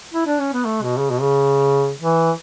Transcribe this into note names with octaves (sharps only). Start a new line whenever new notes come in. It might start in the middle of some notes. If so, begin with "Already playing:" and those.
E4
D4
C#4
B3
A3
B2
C#3
B2
C#3
E3